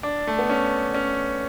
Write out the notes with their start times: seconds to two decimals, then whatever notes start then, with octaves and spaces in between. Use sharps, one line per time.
0.03 D4
0.27 A3
0.39 B3
0.50 C#4
0.94 C#4